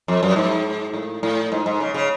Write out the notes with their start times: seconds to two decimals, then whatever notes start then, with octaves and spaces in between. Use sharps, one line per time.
0.08 F2
0.23 F#2
0.36 G#2
0.94 A2
1.23 A2
1.52 G#2
1.66 G#2
1.80 C#3
1.94 C#3